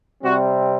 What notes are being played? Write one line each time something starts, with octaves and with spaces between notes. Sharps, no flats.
C3 G3 C4 F#4